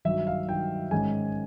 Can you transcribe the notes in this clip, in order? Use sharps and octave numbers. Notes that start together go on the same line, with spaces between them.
G2 D#3 F#3 E5
F5
G2 D#3 F#3 G5
G#2 D#3 G#3 C#4 G#5